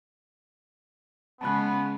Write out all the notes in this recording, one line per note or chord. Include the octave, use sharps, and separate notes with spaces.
C#3 G#3 B3 A5 B5 F#6